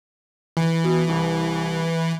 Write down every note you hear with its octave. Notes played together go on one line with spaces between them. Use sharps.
E3
B2
C2